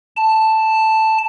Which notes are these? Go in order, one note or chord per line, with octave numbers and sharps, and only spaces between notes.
A5